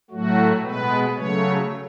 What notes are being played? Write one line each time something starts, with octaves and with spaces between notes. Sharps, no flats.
A2 F#3 A3 F#4
B2 G#3 B3 B4
C#3 F#3 A3 C#5